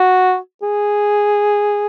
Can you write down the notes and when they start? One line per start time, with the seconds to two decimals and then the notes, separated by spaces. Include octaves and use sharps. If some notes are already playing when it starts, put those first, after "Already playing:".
Already playing: F#4
0.63 G#4